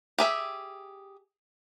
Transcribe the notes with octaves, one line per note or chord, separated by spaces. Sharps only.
G4 G#4 E5